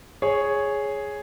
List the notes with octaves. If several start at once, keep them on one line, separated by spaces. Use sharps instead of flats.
G#4 C#5